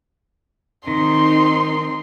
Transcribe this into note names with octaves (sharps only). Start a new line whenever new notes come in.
D#3 C4 D#4 C6